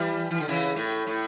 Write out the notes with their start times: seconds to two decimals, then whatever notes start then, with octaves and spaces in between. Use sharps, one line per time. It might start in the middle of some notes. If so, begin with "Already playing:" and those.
Already playing: E3 G3
0.31 E3
0.40 D3
0.48 C#3 E3
0.76 A2
1.07 A2